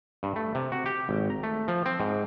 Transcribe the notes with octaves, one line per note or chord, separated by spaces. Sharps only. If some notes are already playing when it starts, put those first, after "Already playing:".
G2
A3
C3
F#4
G4
G#1
A#5
A3
F3
C4
G#2